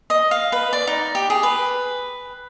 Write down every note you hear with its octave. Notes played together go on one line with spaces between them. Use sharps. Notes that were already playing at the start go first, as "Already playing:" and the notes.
D#5
F5
B4
D5
D#4
G4
G#4
B4